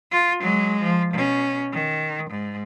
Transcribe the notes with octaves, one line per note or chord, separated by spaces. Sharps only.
F4
F#3 G#3
F3
B2 C#4
D#3
G#2